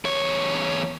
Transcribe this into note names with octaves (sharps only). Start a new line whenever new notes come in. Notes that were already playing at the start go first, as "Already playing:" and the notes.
E2 C#5